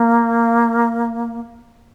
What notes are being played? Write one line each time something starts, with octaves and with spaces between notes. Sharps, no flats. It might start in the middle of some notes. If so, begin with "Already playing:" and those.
Already playing: A#3